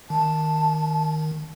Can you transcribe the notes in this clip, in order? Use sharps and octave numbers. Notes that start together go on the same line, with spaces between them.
D#3 A5